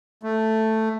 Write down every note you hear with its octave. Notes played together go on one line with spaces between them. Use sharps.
A3